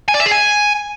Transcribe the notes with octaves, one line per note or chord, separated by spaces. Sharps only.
G#5
D5
E5
G#4
G#5